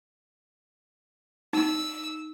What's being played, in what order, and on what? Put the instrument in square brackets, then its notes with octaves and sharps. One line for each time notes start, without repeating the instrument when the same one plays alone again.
[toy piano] D#4 [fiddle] E6